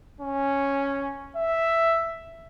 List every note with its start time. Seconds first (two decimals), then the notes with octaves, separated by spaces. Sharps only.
0.21 C#4
1.37 E5